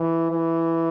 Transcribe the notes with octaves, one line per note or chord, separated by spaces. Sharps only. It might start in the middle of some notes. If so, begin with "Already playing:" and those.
Already playing: E3
E3